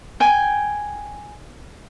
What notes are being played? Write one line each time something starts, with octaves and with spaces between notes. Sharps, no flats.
G5 G#5